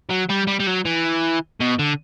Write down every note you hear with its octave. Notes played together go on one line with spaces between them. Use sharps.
F#3
G3
G3
G3
F#3
E3
B2
D3